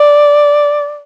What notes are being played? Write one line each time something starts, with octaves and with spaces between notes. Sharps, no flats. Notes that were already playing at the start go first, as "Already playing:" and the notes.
Already playing: D5